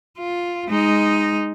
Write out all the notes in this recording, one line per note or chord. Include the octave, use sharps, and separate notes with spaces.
F4
G#3 D#4